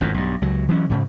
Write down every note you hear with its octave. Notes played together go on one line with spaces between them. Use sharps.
G#1 F2 A2
B1 G2
C#2 F#3
E3 F#3 C4 C#4
G#2 C#3